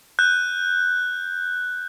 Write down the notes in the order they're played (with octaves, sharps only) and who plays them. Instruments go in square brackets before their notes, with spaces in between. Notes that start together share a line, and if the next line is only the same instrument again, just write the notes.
[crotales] F#6 G6